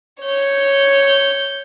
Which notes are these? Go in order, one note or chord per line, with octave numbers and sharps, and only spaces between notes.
C#5 G6